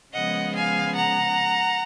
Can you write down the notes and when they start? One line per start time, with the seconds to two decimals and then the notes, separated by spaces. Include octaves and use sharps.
0.14 C#3 F3 G#3 B3 D#5 F#5
0.55 F5 G#5
0.96 F#5 A#5